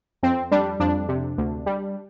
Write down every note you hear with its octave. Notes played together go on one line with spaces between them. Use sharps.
F2 C4
G3 D4
F2 D4
C3
D2
G3